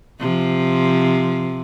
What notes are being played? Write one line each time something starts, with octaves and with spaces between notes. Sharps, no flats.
C3 F3